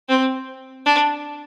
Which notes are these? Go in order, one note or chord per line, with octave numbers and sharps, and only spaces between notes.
C4
D4